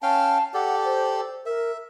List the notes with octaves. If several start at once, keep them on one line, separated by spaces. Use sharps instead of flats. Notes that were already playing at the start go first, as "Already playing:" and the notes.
C#4 F5 G5 A5
G4 A4 D5 F#5
C5
A#4 E5